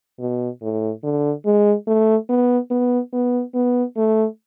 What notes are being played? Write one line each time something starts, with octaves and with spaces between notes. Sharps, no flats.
B2
A2
D3
G#3
A3
B3
B3
B3
B3
A3